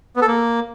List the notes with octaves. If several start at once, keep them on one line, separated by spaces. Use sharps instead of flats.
B3
A4
A#3